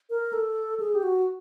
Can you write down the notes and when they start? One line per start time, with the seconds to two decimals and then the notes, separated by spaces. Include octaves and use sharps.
0.10 A#4
0.33 A4
0.80 G#4
0.95 G4
1.03 F#4